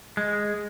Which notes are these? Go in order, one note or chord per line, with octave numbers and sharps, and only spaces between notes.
G#3